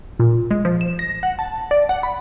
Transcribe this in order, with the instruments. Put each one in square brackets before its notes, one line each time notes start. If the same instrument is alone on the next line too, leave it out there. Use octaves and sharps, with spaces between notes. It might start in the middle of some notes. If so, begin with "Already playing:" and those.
[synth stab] A#2
G#3
F3
E7
A#6
F#5
A5
D5
F#5
B5